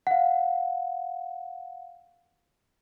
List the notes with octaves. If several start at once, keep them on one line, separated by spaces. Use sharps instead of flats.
F5 F#5